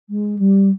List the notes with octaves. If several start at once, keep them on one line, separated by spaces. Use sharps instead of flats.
G#3
G3